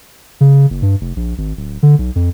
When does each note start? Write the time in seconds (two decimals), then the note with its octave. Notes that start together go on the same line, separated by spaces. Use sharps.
0.41 C#3
0.70 F#1
0.82 G2
1.01 F1
1.16 A#1
1.38 G#1
1.57 D1
1.83 D3
1.99 B1
2.16 F2